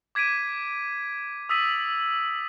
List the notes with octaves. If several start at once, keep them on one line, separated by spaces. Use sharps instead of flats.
D6 G#6 B6 D7 D#7
D#6 E6 A6 B6 D#7 F#7